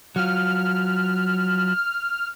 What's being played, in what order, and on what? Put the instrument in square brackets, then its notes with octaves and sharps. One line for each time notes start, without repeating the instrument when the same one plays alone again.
[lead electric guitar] F#3 F4 [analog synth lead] F6